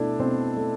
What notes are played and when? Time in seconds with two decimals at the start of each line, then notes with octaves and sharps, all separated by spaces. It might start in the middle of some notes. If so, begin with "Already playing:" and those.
Already playing: B2 A3 D4 E4
0.19 B2 C4 C5
0.57 A3